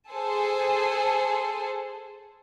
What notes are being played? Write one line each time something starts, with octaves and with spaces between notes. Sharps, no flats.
G#4 A4 C5 G#5 A5